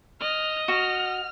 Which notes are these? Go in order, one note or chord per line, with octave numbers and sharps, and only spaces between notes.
D#5 F6
F#4 F6